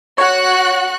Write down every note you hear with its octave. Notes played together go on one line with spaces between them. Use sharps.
F#4 C#5 F#5 F#6